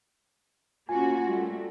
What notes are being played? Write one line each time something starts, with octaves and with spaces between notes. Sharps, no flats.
A#3 C#4 F4 F#4 G#5
G3 A3